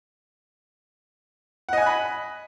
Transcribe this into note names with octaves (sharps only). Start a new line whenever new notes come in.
D#5 F#5 G#5 B5 F#6